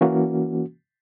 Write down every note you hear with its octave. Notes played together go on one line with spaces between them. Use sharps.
E3 A#3 C#4 F#4